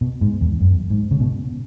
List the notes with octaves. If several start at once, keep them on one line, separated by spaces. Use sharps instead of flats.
B2
G#2
E2
F#2
G#2
C#3
B2